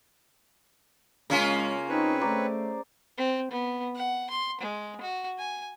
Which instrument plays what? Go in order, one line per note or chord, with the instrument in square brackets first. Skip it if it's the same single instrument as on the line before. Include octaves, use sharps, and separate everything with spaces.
[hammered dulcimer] C#3 [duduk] G#3 [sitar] A#3 C#4 F4
[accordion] C4 B4 C#5 [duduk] D#4
[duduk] A3 [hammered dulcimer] C5 D5 A#5
[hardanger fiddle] C4
B3
F#5
C6
G#3
F#4
G#5